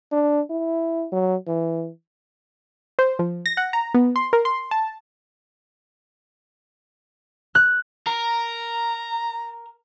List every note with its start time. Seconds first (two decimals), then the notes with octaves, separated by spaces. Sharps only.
0.12 D4
0.50 E4
1.12 F#3
1.47 E3
2.99 C5
3.19 F3
3.46 A#6
3.57 F#5
3.73 A#5
3.94 B3
4.16 C6
4.33 A#4
4.45 C6
4.71 A5
7.55 F#6
8.07 A#4 A#5